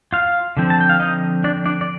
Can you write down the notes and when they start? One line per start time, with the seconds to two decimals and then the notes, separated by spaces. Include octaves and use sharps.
0.13 F4 F5
0.57 D3 F3 C4
0.70 A5
0.81 G5
0.90 F5
1.00 D#4 D#5
1.44 D4 D5
1.66 D4 D5
1.81 D5